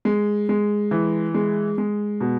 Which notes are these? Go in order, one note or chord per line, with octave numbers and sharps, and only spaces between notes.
G#3
G#3
E3
G#3
G#3
B2